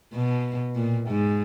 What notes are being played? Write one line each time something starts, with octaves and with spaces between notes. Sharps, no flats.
B2
A#2
G#2